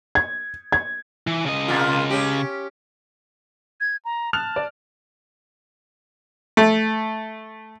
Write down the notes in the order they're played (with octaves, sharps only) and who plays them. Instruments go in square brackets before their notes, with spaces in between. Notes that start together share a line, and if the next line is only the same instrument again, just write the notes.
[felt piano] G#6
G#6
[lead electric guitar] E3
C#3 D#5
[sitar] B2 A#3 F4
C#4 G4
[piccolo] G#6
A#5
[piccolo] A5 [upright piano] F6 F#6 F7
[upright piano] D5
[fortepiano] A3